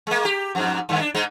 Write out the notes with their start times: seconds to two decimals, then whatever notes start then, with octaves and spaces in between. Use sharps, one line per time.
0.07 G#3 A#3
0.25 G4
0.55 F2 G#2
0.89 G2 D#3
1.01 D4
1.14 G#2 G#3 D#4